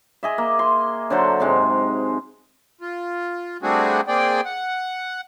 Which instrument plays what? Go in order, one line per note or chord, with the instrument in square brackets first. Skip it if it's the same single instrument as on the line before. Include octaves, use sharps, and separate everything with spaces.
[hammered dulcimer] G#4 D#5 E5
A#3
C6
D3 F#3 A4 C5
G#2 C3 G#3
[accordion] F4
G3 A3 C4 D4 F#4 G#4
A#3 C4 G#4 D5 G5
F#5